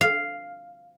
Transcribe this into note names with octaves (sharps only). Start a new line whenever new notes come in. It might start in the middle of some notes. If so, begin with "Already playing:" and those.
F5